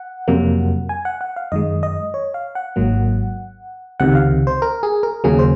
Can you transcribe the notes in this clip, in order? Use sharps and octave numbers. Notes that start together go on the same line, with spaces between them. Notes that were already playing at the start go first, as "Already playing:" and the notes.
Already playing: F#5
F2 C3 F#3 A#3
G#5
F#5
F#5
F5
F#2 D#3 G#3 D#5
D#5
C#5
F5
F#5
G#1 G#2 F#3 A#3
C#2 C3 D#3 F#5
F5
C5
A#4
G#4
A#4
D#2 C#3 F#3 A#3 G#4
C5